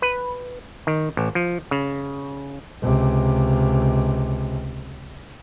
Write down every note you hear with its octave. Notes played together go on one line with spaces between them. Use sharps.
B4
D#3
A1
F3
C#3
C#2 C3